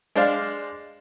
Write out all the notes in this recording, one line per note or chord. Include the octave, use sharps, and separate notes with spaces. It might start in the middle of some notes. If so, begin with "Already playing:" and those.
G#3 D4 C5 D5 F5